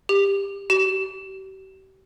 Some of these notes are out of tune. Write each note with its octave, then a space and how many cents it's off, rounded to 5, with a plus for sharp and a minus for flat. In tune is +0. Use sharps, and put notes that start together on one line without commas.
G4 +20
G4 -40